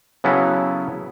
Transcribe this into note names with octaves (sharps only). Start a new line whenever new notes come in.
C#3 F#3 B3 C#4 E4 A4